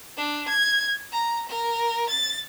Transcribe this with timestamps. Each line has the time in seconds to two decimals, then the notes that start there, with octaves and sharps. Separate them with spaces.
0.17 D4
0.49 G#6
1.12 A#5
1.49 A#4
2.09 A6